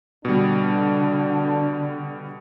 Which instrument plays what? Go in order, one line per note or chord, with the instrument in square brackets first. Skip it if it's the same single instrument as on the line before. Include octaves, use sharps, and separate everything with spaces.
[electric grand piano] B2 G3 [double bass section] D3 [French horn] D4